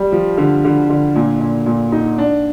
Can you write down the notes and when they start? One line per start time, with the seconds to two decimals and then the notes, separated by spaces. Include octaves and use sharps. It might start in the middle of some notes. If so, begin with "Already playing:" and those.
Already playing: G3
0.12 F3
0.37 D3
0.64 D3
0.90 D3
1.15 A#2
1.40 A#2
1.66 A#2
1.92 D#4
2.18 D4